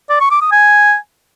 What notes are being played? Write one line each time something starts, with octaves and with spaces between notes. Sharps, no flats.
D5
C#6
D6
D#6
G#5